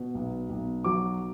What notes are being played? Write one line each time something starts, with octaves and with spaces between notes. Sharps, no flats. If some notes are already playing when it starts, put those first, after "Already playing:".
Already playing: B2
B1
B1
F#3 D6